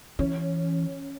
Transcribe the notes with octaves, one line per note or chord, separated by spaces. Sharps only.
E3 C#4